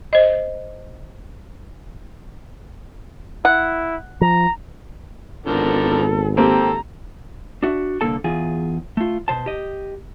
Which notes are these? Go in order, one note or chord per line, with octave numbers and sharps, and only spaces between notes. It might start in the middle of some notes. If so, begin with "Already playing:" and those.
C5 D#5
E4 F#5
F3 A#5
G#1 D3 F3 B3 A4 A#4
A#3 C4 G4 A4 A#5
D4 F#4 E5
C2 D3 A#3 A4 A5
E2 F4 G#4
A3 F4
B2 C5 A5
G4 D#5